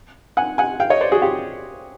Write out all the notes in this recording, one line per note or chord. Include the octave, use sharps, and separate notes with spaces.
F#5 G#5
F#5 G#5
F5 G5
C#5 D#5
C5 D5
F#4 G#4
F4 G4